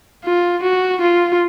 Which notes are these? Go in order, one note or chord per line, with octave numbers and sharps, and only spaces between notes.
F4
F#4
F4